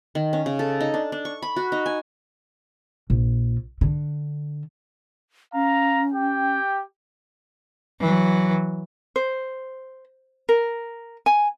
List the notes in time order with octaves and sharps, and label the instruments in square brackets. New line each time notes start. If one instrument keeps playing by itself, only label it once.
[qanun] D#3
C#4
C#3
A4
D#4
D4
D4
C#6
B5
F#4
D#4
G#5
[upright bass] A#1
D3
[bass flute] C#4 [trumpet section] F5 A#5
[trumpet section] G4 G5
[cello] E3 F#3
[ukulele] C5
A#4
G#5